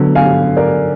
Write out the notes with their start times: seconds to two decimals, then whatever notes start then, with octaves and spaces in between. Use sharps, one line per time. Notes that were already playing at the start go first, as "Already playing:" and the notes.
Already playing: D3 F#3 B3
0.15 F5 G#5
0.57 A#4 D5